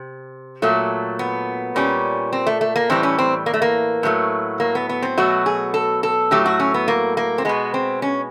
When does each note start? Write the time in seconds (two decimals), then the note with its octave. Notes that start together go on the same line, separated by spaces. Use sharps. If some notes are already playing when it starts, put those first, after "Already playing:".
Already playing: C3
0.62 A#2 F#3 A3
1.19 B3
1.76 A#2 G3 C#4
2.33 C4
2.47 A3
2.61 A3
2.76 A#3
2.90 A2 E3 G3 C4
3.03 C#4
3.18 C4
3.46 A#3
3.54 A3
3.62 A#3
4.03 A2 F#3 A3
4.60 A#3
4.75 B3
4.89 B3
5.03 C4
5.18 B2 F#3 A3 F#4
5.46 G#4
5.74 A4
6.03 A4
6.31 A2 F#3 A3 G4
6.46 F#4
6.60 C#4
6.74 B3
6.88 A#3
7.17 A#3
7.38 C4
7.45 B2 G#3 B3
7.74 C4
8.02 C#4